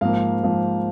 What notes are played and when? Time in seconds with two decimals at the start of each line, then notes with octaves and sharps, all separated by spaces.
0.01 G#2 F3 A#3 F5
0.43 G#2 F3 A#3